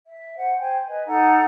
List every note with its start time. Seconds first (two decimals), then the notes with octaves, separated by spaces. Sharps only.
0.06 E5
0.36 C5 F#5
0.59 C5 G5 G#5
0.87 B4 D#5 G#5
1.06 D#4 A4 F#5 A#5